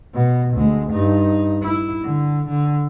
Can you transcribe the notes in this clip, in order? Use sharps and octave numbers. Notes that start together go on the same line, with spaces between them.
B2
D2 G#3
G2 D#4
E4
D3
D3